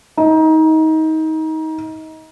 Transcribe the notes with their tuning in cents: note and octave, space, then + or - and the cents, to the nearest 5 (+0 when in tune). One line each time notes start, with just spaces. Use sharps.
D#4 +25